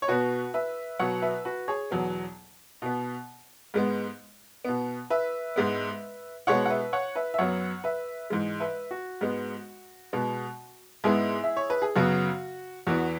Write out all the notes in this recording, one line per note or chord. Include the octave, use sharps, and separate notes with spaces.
C#5
B2 B3 F#4 B4
B4 E5
B2 F#3 B3 C#5 F#5
B4 E5
F#4 B4
G#4 C#5
E2 B2 F#3 B3
B2 B3
G#2 G#3 B3
B2 B3
B4 E5
G#2 G#3 B3
B2 G#3 B3 C#5 F#5
F#5
B4 E5
C#5 F#5
B4 E5
E5
F#2 F#3 B3 C#5 F#5
B4 E5
G#2 E3 G#3
B4 E5
F#4
G#2 G#3 B3
B2 G#3 B3
G#2 G#3 B3 E4 G#4
E5
C#5
B4
G#4
F#2 C#3 F#3 B3 F#4
E2 E3 B3 F#4